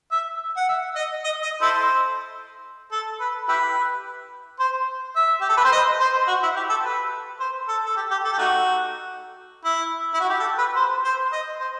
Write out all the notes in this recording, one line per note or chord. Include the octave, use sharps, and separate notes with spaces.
E5
F#5
E5
D#5
D#5
D#5
E4 A4 C5
A4
B4
E4 G4 B4
C5
E5
G4
A4
B4
C5
D#5
C5
F#4
E4
G4
A4
B4
C5
A4
A4
G4
G4
A4
G4
A3 D#4 F#4
E4
E4
F#4
G4
A4
B4
C5
C5
D#5
C5